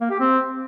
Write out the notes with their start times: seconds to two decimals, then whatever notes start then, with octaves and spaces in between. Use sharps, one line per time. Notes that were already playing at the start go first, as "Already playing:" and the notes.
0.01 A#3
0.10 G4
0.20 C4